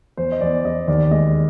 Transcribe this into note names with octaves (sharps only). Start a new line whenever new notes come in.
E2 C5
D#5
E2 D5
E2 D#5
D#2 D5
G#3 D#5